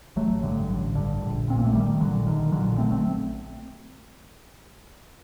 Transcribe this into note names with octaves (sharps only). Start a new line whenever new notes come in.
A1 F#3 A3
G2 D3
A1
G2 D3
A#1
A#2 C4
A#3
A3
A#1 D#3 G3
A#2 D3 F#3
A#1 D#3
A#2 D3 F#3
A#1 A3 C4
A3 C4